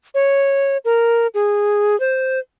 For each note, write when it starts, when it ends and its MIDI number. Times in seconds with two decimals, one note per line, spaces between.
0.14 0.78 73
0.85 1.27 70
1.34 1.98 68
2.00 2.39 72